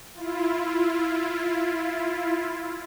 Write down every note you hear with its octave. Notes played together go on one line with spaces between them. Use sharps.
E4 F4